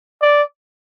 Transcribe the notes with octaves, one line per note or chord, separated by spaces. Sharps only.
D5